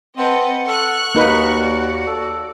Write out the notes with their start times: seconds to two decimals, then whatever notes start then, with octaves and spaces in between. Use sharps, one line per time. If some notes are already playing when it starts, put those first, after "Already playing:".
0.18 C4 B4 D#5 F#5 A5
0.67 A4 C#6 F6 F#6
1.15 D#2 A#3 D#4 F#4 B4
1.60 D5
2.07 A4